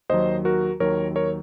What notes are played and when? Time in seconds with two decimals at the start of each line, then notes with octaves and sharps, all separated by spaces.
0.09 D#2 D#3 F#3 C5 D#5
0.45 F#4 A#4
0.80 D#2 D#3 F#3 A#4 C#5
1.16 A#4 C#5